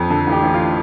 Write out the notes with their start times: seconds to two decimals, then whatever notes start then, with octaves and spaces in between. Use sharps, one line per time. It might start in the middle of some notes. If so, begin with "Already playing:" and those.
Already playing: F2
0.10 D3 A4
0.27 A1 G4
0.43 A1
0.54 F4